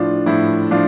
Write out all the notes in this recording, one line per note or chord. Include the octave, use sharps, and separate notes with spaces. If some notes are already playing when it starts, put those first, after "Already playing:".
Already playing: A2 F3 D4 F4
A2 F3 E4
F3 D4 F4